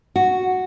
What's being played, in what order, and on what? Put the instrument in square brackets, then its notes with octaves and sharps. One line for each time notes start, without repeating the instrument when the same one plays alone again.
[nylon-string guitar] F#4